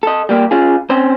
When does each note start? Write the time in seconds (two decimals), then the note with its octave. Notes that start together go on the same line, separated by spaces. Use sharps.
0.03 A4 D#5
0.29 G3 A#3 G4
0.51 C#4 F4 G#4
0.90 C4 C#4 C5